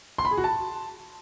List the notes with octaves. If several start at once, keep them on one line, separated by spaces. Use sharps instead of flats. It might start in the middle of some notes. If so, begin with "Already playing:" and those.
C6
B5
G#4
F#4
A5